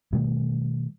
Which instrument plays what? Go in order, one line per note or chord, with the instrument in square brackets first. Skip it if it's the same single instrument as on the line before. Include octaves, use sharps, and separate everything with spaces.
[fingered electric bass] B2 D#3 G3 A3